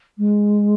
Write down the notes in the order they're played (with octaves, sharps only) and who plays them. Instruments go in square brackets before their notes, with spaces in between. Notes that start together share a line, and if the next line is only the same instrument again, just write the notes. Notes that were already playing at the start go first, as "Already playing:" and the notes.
[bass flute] G#3